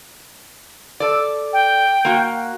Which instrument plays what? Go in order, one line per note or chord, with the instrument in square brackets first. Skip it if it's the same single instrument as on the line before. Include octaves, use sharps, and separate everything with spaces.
[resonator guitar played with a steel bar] A4 D5
[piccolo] G5
[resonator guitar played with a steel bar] A#3 F#4